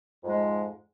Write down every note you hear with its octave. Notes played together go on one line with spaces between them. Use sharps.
F2 G#2 G#3